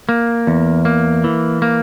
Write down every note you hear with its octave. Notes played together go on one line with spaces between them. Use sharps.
A#3
E2
A#3
E3
A#3